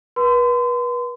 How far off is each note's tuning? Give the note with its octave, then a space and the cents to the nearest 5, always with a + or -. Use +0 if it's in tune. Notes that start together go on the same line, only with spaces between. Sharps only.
B4 -30 C6 -35